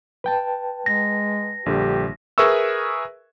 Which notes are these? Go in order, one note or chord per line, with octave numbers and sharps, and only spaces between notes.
B4 G5 A5
G#3 A#6
A#1 D3 G3 G4
G#4 A#4 B4 E5 C#6 E6